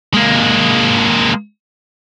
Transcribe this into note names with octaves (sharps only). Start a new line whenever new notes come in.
G#3 A#3